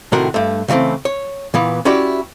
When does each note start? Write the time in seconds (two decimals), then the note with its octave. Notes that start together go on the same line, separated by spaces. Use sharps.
0.12 A2 C3 D#3 F#4 A#4 F#5
0.34 G2 A3
0.68 C#3 E3 G#3 A3 C4
1.05 C#5
1.54 A#2 E3 B3
1.85 C#4 E4 F#4 G4 D5